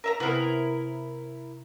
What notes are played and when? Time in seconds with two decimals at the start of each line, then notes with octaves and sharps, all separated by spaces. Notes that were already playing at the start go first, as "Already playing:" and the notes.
0.04 A#4 E5 A#5
0.20 C3 B3 C4 E4 G#4 A#4